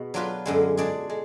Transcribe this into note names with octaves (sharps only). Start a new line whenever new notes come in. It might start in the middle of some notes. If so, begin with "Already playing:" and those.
Already playing: B2 B3 G#4
F#3 D4 F4 B4
F#2 D3 G#3
G#3 D4 G#4 D5
G#3